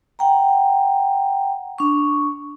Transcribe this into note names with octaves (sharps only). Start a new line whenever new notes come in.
F#5 G5 A#5
D4 C#6